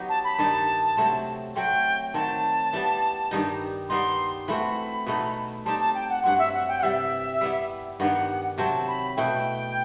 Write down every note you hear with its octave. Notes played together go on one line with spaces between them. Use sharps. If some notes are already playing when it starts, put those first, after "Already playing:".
Already playing: F#3 B3 D#4 G4
A5
B5
G2 D#3 G3 D#4 A5
C3 F#3 A3 C4
F#3 A3 C4 G5
D#3 F#3 C4 A5
E3 G3 B3
G2 D#3 G3 D#4
G3 B3 D#4 C6
E3 A3 C4 F#4 B5
B2 A3 D#4 A4
G3 C4 D#4 G4 A5
A5
G5
F#5
G2 F#3 C4 F#5
E5
F#5
G5
F#5
C3 E3 G3 E5
G3 B3 E4
G2 D#3 G3 B3 F#5
C3 F#3 C4 A5
B5
B2 A3 E4 G5